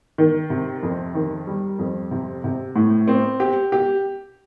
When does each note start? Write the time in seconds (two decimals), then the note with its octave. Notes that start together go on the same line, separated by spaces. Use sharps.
0.18 D#3
0.50 C3
0.83 F2
1.15 D#3
1.47 G3
1.79 F2
2.11 C3
2.44 C3
2.76 A2
3.08 C4
3.40 G4
3.72 G4